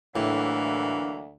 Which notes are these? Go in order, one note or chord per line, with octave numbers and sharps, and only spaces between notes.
D2 A2 E3 F#3 A#3 D4